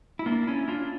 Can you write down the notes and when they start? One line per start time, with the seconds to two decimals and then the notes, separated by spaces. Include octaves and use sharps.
0.19 E4
0.26 A#3 D4
0.47 C#4 E4
0.68 D4 F4